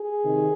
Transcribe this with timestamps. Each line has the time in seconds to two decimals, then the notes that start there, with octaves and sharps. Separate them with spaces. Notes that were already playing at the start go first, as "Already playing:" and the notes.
Already playing: G#4
0.25 C3 D#3